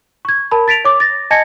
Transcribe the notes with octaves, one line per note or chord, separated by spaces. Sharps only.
C#6 G#6
A#4 A5 B5
A6 B6 D7 F7
C#5 D6
A6 A#6
D#5 G#5 A5 G#6 A#6 C#7